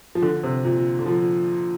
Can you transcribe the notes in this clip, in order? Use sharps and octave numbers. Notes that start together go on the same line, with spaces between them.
F3
D3
C3
A#2
D3
F3